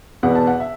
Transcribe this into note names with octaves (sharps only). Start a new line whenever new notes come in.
E2 B2 B3 F#5
A5
F#5
E5